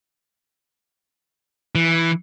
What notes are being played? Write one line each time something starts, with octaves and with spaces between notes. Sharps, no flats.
E3